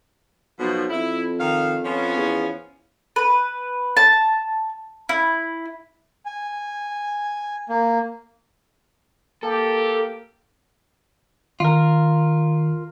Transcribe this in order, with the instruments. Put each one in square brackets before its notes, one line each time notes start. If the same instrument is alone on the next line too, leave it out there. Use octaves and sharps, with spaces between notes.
[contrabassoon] B1 [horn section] B2 F3
[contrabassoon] F2 [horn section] E4
[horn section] D#3 F5
F3 B3 C#4
[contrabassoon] E2
[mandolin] B4
A5
E4
[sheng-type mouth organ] G#5
A#3
[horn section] A#3 [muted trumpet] G4 [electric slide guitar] A4
[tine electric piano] D#3 [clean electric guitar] F4 A#4